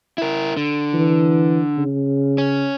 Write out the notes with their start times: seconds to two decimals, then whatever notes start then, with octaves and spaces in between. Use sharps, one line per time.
0.18 E4 A#4
0.57 D3
0.94 E3
1.77 C#3
2.38 C#4